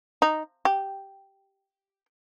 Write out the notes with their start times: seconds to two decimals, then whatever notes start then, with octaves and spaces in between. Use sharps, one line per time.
0.22 D#4
0.65 G4